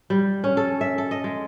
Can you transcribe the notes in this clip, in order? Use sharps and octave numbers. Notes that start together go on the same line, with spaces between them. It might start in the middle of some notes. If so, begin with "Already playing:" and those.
G3
C#4
A4
E5
A4
D#5
G#3